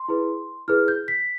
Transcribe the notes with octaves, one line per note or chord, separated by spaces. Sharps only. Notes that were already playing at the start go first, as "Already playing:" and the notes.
Already playing: C6
E4 G#4 B4
E4 G#4 B4 F6
G6
B6